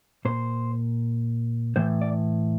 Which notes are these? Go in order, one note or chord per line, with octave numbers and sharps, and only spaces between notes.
A#2 C5
A2 E3 C5
D5